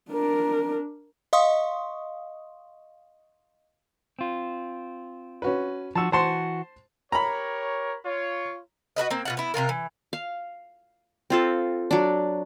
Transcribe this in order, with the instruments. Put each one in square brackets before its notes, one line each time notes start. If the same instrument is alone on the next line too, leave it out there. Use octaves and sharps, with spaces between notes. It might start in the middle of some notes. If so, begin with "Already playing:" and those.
[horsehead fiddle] D4 A#4
[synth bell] D#5 F5 C6 C#6 D#6
[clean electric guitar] C4 F4
[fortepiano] C#4 F#4 B4
[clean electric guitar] F3 F#4 [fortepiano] A5 E6
[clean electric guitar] E3 F#4 [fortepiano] C5 A5 C6
[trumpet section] G4 A#4 C#5 [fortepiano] A#5 B5
[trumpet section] F4 C#5
[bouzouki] F#4 A#4 B4 D#5
A#3 C4
B2 F4 F#5
B3 E4
C3 E3 F4 A#4
E3
[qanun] F5
C4 F4 A4
F#3 D4